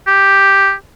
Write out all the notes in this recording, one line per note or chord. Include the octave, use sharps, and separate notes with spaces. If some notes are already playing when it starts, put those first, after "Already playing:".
G4